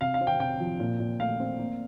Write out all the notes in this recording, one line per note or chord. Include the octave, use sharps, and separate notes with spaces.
C3 F5
F5
C4
G5
C3 G5
F3
A#2
A#2
A3 F5
C4
A#3